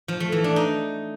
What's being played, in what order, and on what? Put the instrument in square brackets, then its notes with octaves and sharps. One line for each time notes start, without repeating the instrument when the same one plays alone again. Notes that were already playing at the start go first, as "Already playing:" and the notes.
[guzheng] F3
A3
E3
D4
D#4